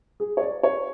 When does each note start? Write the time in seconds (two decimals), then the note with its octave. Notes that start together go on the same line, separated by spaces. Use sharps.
0.20 G#4
0.37 C#5
0.41 D5
0.63 C#5